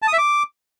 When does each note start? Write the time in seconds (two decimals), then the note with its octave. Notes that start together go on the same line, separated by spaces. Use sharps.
0.02 A5
0.08 D#6
0.13 E5
0.18 D6